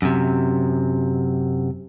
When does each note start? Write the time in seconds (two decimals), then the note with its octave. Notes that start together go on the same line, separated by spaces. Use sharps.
0.02 F#2 C3